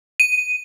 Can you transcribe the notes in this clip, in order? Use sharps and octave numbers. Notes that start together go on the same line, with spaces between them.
D#7